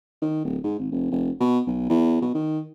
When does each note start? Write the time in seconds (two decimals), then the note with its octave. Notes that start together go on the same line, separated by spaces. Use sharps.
0.22 D#3
0.44 D1
0.64 G#2
0.79 G#1
0.92 F1
1.11 F1
1.40 B2
1.67 B1
1.89 E2
2.21 B2
2.34 D#3